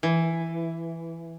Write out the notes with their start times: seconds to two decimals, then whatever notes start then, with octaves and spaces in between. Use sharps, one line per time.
0.03 E3